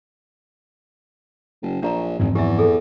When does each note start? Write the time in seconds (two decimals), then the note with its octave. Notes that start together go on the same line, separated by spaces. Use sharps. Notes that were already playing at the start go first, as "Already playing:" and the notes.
1.62 F#1
1.82 A#1 D4 G4 A#5
2.20 G#1 F2 G#2 E3
2.35 E2 G4 E5
2.59 G#4 A4